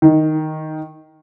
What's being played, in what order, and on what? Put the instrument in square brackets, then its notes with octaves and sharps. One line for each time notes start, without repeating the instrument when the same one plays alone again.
[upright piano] D#3